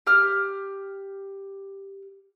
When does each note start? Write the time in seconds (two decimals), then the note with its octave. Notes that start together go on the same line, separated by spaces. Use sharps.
0.07 G4 F6